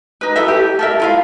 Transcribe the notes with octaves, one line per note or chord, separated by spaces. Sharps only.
D#4 B4
E4 A4 E5
G4
A4 A#4 E5
E4 F4 F5